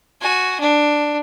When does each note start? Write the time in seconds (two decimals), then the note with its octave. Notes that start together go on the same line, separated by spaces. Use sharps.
0.21 F#4 G#5
0.60 D4